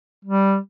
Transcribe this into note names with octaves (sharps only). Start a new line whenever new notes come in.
G3